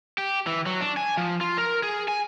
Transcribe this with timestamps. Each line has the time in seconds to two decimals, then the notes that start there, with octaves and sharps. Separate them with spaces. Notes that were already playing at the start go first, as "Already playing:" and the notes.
0.18 G4
0.47 E3
0.66 F#3
0.81 D4
0.97 G#5
1.17 F3
1.41 F4
1.58 A#4
1.83 G#4
2.08 G#5